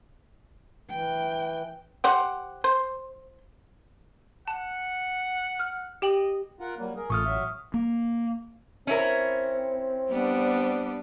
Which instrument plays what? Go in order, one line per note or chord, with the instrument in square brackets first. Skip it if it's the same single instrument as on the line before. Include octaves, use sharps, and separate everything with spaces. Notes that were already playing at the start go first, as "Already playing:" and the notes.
[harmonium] E3 [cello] G5
[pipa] G4 C5 F#5
C5
[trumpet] F#5 [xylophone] A5
[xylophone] F6
[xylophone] G4 G5 F#7 [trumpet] D#5
[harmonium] F4 A#4 F#5
F#3 G3 A#3
G#4 A#4
[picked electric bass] A1 [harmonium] A3 F4 [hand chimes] C#6 D#6 F6
[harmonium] F#3 E5
[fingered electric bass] A#3
[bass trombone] C4 [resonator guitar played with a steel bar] C#4 E4 A#4
[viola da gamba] G3 B3 D4